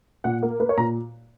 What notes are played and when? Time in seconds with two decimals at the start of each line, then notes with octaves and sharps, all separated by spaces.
0.24 A#2 F#5
0.43 A#3
0.60 A#3 B4
0.69 C#5
0.78 A#2 A#5